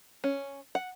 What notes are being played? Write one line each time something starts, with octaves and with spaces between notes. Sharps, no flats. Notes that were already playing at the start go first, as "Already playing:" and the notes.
C#4
F#5